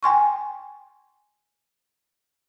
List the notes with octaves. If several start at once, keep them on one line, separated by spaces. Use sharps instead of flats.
G5 G#5 C6 C#6